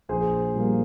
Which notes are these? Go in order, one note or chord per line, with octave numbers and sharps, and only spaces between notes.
A#1 G#4 C5
A#2 G3 A#3